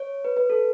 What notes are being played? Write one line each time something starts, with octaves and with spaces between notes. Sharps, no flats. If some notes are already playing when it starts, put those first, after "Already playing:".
Already playing: C#5
B4
B4
A4